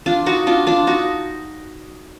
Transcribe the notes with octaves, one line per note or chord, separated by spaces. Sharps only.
D4 F4
D#4 F#4
D4 F4
D4 F4
D#4 F#4